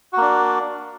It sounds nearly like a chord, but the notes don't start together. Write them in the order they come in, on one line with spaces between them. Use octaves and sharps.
F#4 A#3 D4